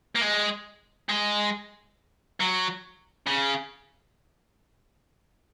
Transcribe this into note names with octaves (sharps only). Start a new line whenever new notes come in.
A#3
G#3
G#3
F#3
C#3